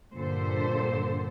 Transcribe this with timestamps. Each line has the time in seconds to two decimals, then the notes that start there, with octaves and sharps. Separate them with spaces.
0.14 G2 A#2 D3 A4 C5